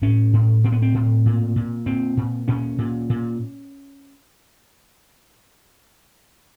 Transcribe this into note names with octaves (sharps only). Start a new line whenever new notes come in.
A2 C#4
A2
A2 C4
B3
C4
A2
A#2
A#2
A#2 C4
A#2
A#2 C#4
A#2
A#2